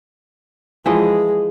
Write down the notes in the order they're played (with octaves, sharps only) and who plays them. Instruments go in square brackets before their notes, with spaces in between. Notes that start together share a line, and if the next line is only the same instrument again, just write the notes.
[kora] E3 F3 D#5 [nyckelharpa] G#3